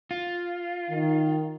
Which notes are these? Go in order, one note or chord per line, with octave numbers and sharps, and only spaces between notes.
F4
D#3